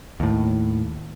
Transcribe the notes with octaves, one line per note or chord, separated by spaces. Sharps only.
D#2 A2